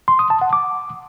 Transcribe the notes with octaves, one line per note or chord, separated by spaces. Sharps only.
C6
D#6
A5
F#5
D6